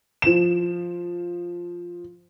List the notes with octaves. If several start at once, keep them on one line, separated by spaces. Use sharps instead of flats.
F3 E7